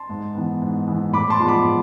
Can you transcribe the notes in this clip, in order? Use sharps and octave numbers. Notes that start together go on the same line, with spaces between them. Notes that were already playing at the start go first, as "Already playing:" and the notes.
Already playing: A5 C6
G#2
E3 B3
G#2
E3 B3
A2 B5 D6
A5 C6
F3 G#3 B3
B5 D6
A2